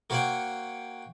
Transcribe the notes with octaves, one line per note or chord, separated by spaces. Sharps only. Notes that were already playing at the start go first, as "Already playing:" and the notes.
A#3 F#4 C5 C#5 F#5 G5